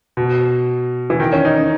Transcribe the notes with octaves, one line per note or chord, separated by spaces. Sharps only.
B2
E3
D#3
C#4
D#4
C#4